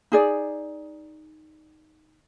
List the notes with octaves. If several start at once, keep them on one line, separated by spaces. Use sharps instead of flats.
D#4 G#4 D5